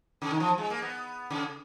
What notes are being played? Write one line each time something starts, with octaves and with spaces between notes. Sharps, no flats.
C#3
D#3
F3
G#3
A#3
B3
C#3